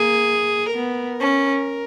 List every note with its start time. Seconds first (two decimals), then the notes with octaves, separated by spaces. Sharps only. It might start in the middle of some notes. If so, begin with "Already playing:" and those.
Already playing: A#3 G#4
0.74 B3 A#4
1.19 C#4